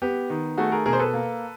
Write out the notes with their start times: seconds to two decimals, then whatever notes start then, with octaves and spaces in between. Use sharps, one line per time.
0.02 B3 G4
0.30 D#3
0.57 A3 F#4 G#4
0.72 G#4 A#4
0.86 B2 G#4 A#4
0.93 C5
0.99 A4 B4
1.14 A#3